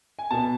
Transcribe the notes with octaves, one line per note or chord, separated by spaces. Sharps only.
G#5
B2 B3 A5